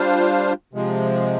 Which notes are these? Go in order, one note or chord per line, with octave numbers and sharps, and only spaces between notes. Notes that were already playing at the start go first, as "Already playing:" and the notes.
Already playing: G3 D4 F4 C5 F5
C3 F3 G#3